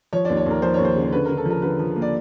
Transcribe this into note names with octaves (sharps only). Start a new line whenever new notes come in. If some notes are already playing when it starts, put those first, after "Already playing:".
F3 C#5
D5
D#2
C#5
D#2 A#4
F3 C5
D#2 C#5
C5
C#3
C5
D3 B4
A#4
D3
A4
F3
A#4
D3 B4
F3
A#3
D5